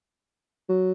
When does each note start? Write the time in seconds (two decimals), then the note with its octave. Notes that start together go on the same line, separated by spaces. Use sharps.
0.69 F#3